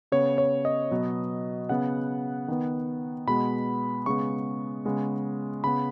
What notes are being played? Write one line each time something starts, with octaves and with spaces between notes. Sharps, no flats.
C#3 B3 C#5
C#5
D#5
B2 F#3 B3
C#3 B3 F#5
D#3 B3
B2 G#3 B3 B5
C#3 G#3 B3 C#6
C#3 G#3 B3
C#3 B3 B5